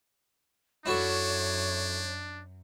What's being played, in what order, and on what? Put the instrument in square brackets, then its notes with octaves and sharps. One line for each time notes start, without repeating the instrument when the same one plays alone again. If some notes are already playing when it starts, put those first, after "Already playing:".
[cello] F#2 [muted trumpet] D4 [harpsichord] E4 F#4 A4 [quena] C#5